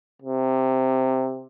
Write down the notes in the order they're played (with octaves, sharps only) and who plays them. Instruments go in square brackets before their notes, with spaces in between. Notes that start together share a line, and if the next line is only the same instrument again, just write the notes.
[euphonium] C3